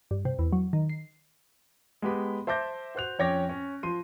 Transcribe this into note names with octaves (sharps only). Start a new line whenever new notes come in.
G2
C3
E2
F#3
D#3
C7
G#3 B3 G4 B5
C5 E5 A5 D6 G6 A#6
F#4 C5 F#6 F7
F2 C#4 C#5 G5 D6 A#6
C#4
F3 C6 D#7